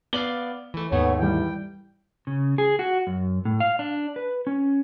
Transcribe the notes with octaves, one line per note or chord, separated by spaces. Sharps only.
B3 D5 F5 G7
E3 A3
D#2 G#2 A3 B3 C#5
E3 G3 G5
C#3
G#4
F#4
F#2
A2
F5
D4
B4
C#4